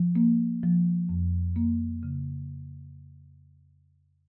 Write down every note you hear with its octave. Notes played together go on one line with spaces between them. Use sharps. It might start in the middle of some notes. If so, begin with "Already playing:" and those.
Already playing: F3
A#3
F3
F2
A#3
C#3